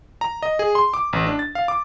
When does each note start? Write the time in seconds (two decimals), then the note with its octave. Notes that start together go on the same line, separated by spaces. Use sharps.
0.21 A#5
0.43 D#5
0.59 G#4
0.75 C6
0.94 D6
1.13 A1
1.27 D4
1.39 A6
1.55 F5
1.68 D6